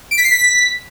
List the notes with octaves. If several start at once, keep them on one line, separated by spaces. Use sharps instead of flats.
D7
B6
C7
B6